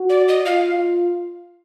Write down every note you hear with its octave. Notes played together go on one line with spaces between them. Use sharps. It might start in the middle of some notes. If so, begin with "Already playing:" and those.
Already playing: F#4
D5
D#5
F4 F5